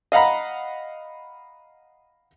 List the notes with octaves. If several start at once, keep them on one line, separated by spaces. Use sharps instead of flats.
D#5 F5 F#5 A#5 B5